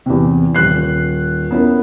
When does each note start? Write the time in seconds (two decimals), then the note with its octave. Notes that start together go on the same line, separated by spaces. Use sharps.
0.06 E2 C3
0.55 D#1 F#6 C7
1.51 B3 C#4 E4 A#4